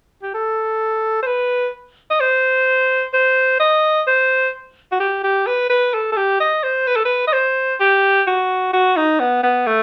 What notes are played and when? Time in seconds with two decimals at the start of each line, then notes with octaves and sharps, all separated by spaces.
0.22 G4
0.34 A4
1.22 C5
1.26 B4
2.11 D#5
2.20 C5
3.14 C5
3.60 D#5
4.07 C5
4.92 F#4
5.00 G4
5.24 G4
5.47 B4
5.70 B4
5.94 A4
6.12 A4
6.17 G4
6.40 D#5
6.63 C5
6.87 B4
6.96 A4
7.05 B4
7.27 D#5
7.33 C5
7.80 G4
8.27 F#4
8.73 F#4
8.96 D#4
9.20 B3
9.43 B3
9.67 A3